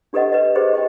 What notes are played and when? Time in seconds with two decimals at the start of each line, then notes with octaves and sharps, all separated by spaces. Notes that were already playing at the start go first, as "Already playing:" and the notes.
0.13 D4 G4 A4 B4 D#5 F#5
0.32 B4 D#5
0.55 G4 G#4 B4 C5 D#5
0.73 G4 D#5 G5